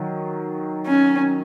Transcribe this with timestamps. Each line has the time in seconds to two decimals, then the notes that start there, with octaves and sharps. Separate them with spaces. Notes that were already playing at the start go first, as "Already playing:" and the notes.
Already playing: D#3 F#3
0.86 C#4